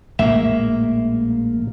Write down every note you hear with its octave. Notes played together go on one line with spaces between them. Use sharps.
A#1 A2 G#3 A#3 E5